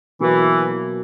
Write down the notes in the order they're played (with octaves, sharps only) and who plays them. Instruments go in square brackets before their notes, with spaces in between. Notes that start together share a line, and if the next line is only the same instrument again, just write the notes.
[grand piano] B2 F#3 A#3 [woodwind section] E3